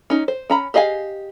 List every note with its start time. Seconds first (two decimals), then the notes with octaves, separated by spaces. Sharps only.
0.10 C#4 D#4
0.28 C5
0.50 C#4 A#5 B5
0.74 G4 G#4 D#5 F5 G#5